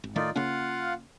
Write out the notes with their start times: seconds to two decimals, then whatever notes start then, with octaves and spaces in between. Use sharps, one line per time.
0.04 G#1
0.16 A2 D#3 A3 D#4 F4 D5
0.36 C#3 A#3 C#4 F4 F5 F#5